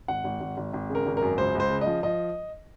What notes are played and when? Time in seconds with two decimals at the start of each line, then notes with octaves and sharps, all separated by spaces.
0.08 G#1 F#5
0.24 G#1
0.40 G#1
0.57 G#1
0.73 G#1
0.90 C#3
0.95 A#4
1.06 G#1
1.17 A#4
1.22 F#2
1.38 C#2 C5
1.55 C#2 C5
1.70 C#3
1.81 D#5
1.87 F3
2.03 F3 D#5